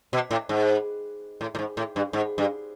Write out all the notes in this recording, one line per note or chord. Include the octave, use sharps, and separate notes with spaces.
B2
A2
G#2
A2
A2
G#2
A2
G2
G#2
G2